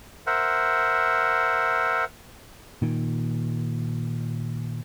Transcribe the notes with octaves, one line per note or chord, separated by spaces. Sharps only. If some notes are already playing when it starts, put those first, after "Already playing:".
A#4 C5 E5 F#5
A#2 D#3